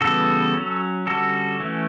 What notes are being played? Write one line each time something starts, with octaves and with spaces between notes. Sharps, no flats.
C#3 E3 G3 B3 F#4 A4
F#3 C#4
D3 G3 C#4 F#4 A4
E3 A3 C#4